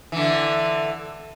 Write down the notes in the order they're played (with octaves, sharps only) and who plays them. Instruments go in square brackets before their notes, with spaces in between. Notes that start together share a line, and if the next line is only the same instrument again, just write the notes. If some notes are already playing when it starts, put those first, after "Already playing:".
[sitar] D3 E3